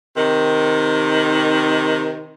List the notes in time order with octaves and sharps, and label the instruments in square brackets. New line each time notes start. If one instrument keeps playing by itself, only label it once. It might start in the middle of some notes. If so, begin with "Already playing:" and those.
[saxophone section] C3 D#3